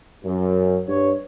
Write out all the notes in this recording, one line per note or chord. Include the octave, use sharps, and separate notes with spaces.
F#2
G2 C#5